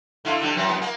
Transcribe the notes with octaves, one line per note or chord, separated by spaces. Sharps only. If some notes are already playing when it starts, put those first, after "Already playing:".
D3 E4 F4
D3 G3
F#2 E3
F#2 B3
A#3